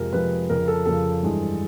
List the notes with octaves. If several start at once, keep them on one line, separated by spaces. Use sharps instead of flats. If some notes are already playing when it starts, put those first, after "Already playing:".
Already playing: F2 C3 F3 G#3 A#4
F2 C3 F3 G#3 B4
F2 C#3 F3 A#4
A4
F2 C#3 F3 A4
G2 E3 G#3